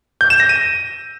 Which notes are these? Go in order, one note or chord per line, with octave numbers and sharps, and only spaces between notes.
G6
E7
A#6
D#7